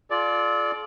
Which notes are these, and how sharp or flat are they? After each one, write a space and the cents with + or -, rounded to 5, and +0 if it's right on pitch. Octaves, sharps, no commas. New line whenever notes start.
F4 +0 A4 -45 D5 +0